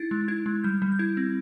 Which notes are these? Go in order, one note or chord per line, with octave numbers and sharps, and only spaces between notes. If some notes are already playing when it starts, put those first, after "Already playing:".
Already playing: D#4 E4 A6
G#3
E4 G#6
G#3
G3 G6
G3
G6
E4 G#6
C4